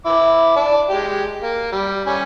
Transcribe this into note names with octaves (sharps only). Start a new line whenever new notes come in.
E4 D6
D5 A5
G#3 G4
A#3
G3
G3 C#4 G#5